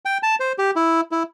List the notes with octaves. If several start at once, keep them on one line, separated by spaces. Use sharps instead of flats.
G5
A5
C5
G4
E4
E4